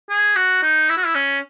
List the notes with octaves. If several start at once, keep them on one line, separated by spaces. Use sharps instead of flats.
G#4
F#4
D#4
E4
F#4
E4
C#4